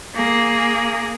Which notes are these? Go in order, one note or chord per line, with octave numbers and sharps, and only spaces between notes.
A#3 G#4